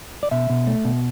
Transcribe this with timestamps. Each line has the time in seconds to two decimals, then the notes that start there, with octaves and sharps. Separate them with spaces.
0.23 D5
0.31 B2 E5
0.50 B2
0.67 A3
0.85 B2